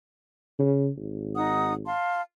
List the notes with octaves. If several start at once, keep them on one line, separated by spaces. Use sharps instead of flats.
C#3
G#1
D#4 F#5 D#6
F5 A5 C6